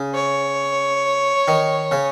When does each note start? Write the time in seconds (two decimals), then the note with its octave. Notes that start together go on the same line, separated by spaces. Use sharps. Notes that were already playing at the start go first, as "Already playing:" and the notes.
Already playing: C#3
0.14 C#5
1.48 D#3
1.91 C#3